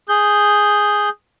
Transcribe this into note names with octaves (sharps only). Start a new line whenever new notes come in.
G#4 G6